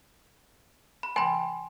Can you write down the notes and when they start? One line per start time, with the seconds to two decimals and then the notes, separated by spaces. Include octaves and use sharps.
1.03 B5
1.16 G5 G#5 B5 C6